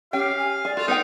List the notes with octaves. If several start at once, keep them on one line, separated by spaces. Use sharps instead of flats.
C#4 G4 F5 G5
G#5
G#4 D5
F4 F#4 A4
B3 D#4 A4 G5